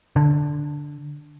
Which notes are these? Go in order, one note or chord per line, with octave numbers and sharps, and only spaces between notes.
D3